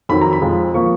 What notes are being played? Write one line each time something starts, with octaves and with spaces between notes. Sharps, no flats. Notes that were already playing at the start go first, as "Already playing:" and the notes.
F2 D#3 F#3 B5
A#5
B5
F2 F3 G#3
F3 A#3 C#6